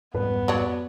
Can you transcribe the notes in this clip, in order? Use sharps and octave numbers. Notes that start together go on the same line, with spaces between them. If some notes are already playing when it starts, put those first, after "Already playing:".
F2 G#2 G3 B3 B4
F#3 D4